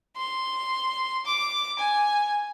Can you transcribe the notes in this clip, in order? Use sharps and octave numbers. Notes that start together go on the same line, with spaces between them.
C6
D6
G#5